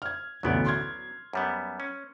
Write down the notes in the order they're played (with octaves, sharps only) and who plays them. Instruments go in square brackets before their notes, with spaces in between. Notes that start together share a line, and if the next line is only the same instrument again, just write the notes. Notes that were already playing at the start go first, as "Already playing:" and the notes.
[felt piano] F6 G#6
[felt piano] A1 D2 B2 [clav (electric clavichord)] F#3 B3 D5
[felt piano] C6 F6 G#6
[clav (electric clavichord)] F#2 G3 B3
C#4